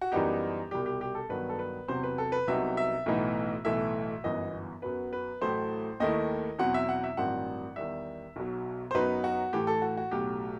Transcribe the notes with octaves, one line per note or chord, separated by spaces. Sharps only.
F#4
F#2 E3 G3 B3 D#4 G4
C2 B2 G3 G4
G4
G4
A4
G2 D#3 F#3 B3 B4
A4
B4
E2 C3 F#3 C4 C5
B4
A4
B4
C2 C3 F#3 B3 D#4 E5
E5
B1 A2 E3 B3 D#4
B1 A2 E3 A3 E5
G1 F#2 E3 B3 D#5
F#2 F#3 B3 B4
B4
A1 A2 F#3 A3 E4 C5
D#2 D#3 A3 E4 D#5
E2 B2 F#3 C4 E4 F#5
E5
F#5
E5
A1 G2 D#3 F#3 C4 F#5
E2 D#3 G3 E5
B1 B2 F#3
C5
F#2 F#3 B3 D#4 B4
F#4
A2 E3 A3 G4
A4
F#4
F#4
B1 A2 F#3 G4